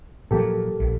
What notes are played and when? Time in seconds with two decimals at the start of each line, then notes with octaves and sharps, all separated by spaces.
0.31 A#2 F3 F#3 A#3 G4 A4
0.80 A#1